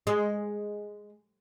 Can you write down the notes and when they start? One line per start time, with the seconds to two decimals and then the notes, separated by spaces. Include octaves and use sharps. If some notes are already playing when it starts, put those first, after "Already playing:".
0.07 G#3